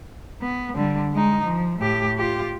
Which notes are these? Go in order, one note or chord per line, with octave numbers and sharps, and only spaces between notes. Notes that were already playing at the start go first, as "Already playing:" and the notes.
B3
D3 G3
G#3 D#4
F3
A2 G4
F4 G4